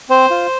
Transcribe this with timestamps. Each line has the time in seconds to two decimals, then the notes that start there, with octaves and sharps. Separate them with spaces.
0.10 C4 C5
0.31 F4